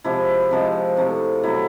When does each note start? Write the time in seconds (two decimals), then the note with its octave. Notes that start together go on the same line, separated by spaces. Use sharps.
0.04 C3 F3 G#3 E4
0.51 C3 F3 G#3
0.97 C3 E3 A3
1.43 B2 F#3 A3 E4